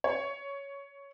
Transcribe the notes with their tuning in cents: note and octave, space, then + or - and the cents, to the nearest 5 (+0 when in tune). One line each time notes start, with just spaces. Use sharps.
C#5 +15